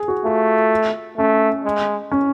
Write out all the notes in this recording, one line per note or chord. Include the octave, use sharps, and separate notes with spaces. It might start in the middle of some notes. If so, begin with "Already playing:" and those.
Already playing: G#4
F#4
A3 F4
A3 C#4
G#3
C#4